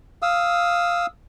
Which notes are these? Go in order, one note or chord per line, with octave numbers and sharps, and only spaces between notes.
F5 D#6 E6